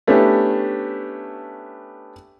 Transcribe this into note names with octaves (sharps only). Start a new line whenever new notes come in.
A3 B3 C#4 D4 E4 G4